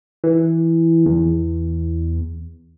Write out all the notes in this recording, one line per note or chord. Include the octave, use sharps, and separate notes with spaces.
E3
E2